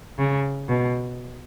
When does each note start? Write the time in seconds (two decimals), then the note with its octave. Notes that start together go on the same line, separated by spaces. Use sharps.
0.18 C#3
0.69 B2